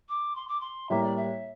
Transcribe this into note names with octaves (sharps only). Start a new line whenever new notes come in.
D6
C6
D6
C6
A2 G3 A#3 E5
D5
E5